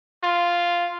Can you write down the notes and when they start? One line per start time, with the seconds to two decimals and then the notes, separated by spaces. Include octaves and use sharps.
0.24 F4